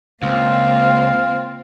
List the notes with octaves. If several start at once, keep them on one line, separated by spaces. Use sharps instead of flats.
C#2 A#3 C4 F4 F5